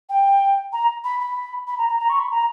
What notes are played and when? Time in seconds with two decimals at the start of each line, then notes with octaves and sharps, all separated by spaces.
0.09 G5
0.73 A#5
1.04 B5
1.20 B5
1.67 B5
1.78 A#5
1.89 A#5
1.99 A#5
2.09 C#6
2.20 B5
2.31 A#5